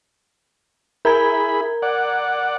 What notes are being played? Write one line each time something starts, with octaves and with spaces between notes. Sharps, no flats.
E4 G#4 A#4 A#5 B5 G#6
D5 F#5